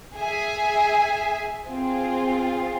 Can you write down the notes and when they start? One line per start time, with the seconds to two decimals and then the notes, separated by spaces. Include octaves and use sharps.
0.16 G#4 E5 G#5
1.67 C4 F4 G#4